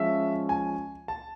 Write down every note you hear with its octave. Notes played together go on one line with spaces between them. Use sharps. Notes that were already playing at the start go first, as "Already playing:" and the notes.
Already playing: F3 G#3 C#4 E5
G#5
A5